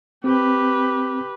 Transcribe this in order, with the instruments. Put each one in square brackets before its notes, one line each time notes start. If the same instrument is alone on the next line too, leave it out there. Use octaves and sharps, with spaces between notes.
[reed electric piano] C4 [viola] G4 B4